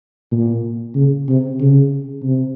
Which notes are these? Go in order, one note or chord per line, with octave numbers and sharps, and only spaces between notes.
A#2
C#3
C3
C#3
C3